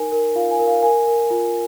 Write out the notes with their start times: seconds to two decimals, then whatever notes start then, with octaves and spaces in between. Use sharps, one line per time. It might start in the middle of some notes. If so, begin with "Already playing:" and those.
Already playing: D#4 A#4 G#5
0.12 A#4
0.35 F4 F5
0.51 G#5
0.59 A#4
0.67 F5
0.82 A#4 G#5
1.07 A#4
1.30 F4